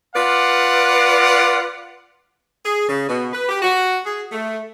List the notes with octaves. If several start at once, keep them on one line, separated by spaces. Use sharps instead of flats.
F4 B4 D5 F5 F#5
G#4
C#3
B2
B4
G4
F#4
G#4
A3